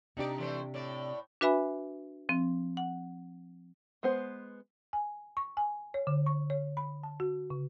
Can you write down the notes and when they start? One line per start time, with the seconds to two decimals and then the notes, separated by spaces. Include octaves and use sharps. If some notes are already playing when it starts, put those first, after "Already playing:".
0.17 C3 D4 D#4 G4 D5
0.38 E3 A3 C5
0.74 A2 D5
1.41 D4 F#4 B4 E5 G#5 B5
2.29 F3 C4
2.77 F#5
4.03 G#3 B3 C5
4.93 G#5
5.37 C#6
5.57 G#5
5.94 C#5
6.07 D3
6.26 C#6
6.50 C#5
6.77 B5
7.03 A5
7.20 F#4
7.50 C#3